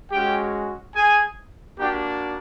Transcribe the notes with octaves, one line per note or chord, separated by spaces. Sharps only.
G#3 C#4 F#4 G4 G5
G#4 G#5
A#3 D4 F#4 G4 G5